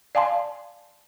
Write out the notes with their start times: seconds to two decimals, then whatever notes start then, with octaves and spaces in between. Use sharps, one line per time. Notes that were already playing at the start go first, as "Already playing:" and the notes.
0.15 D5 F5 G#5 A5 C6